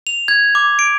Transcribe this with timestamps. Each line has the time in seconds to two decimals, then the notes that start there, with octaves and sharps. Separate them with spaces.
0.07 F7
0.28 G#6
0.55 D6
0.79 D7